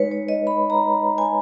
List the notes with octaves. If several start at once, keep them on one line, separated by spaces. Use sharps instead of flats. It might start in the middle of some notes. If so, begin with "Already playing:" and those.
Already playing: G#3 D#4 B4 C#5
C#5
D#5
B5
A#5
G#5